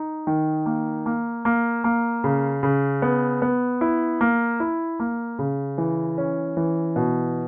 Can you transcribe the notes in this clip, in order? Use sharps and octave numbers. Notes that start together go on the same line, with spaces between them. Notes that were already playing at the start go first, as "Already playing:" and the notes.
Already playing: D#4
D#3
A#3
A#3
A#3
A#3
C#3
C#3
B3
B3
E4
A#3
E4
A#3
C#3
E3
C#4
E3
B2